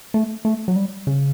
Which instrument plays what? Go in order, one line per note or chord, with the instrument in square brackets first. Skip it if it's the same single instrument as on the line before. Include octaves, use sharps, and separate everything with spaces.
[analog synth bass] A3
A3
F#3
G3
C#3